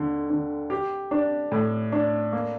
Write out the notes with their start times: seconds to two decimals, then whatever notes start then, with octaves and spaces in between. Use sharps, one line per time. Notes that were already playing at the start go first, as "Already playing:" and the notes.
Already playing: D#2 D3
0.30 D3
0.70 G4
1.11 D4
1.52 A2
1.92 D4
2.33 A#3